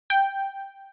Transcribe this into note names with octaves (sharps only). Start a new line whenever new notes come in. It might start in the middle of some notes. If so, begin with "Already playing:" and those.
G5